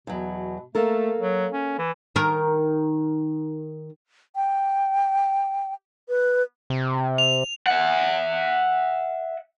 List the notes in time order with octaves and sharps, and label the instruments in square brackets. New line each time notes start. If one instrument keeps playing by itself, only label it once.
[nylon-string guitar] E2 F#3 [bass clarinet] B2
[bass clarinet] A3 [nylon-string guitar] A#3 A4 A#4
[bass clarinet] F#3
C#4
E3
[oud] D#3 A#4
[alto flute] G5
B4
[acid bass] C3
[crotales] F7
[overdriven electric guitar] E5 F#5